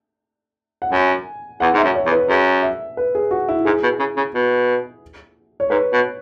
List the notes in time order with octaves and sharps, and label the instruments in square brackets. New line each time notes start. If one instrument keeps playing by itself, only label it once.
[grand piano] F#5
[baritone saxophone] F#2 [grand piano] G#5
[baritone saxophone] E2 [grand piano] F#5
[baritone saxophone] G#2 [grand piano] E5
[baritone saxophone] F#2
[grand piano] C#5
[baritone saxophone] E2
[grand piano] B4
[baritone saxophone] F#2 [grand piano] G#4
[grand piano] E5
B4
G#4
F#4
E4
[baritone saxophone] G#2 [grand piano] G#4
[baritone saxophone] B2
C#3
C#3
B2
[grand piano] C#5
[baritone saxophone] G#2 [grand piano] B4
[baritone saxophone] B2